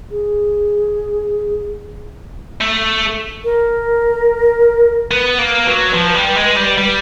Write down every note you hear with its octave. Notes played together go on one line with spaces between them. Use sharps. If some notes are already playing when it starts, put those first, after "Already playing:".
G#4
A3
A#4
B3 B4
A#3
F#3
F3
G3
G#3
G3
G3